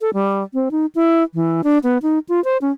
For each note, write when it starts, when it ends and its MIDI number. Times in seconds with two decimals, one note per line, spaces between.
0.01 0.11 69
0.14 0.44 55
0.54 0.69 60
0.71 0.86 63
0.95 1.23 64
1.34 1.62 52
1.64 1.78 62
1.84 1.98 59
2.02 2.19 63
2.29 2.43 65
2.44 2.58 72
2.61 2.71 61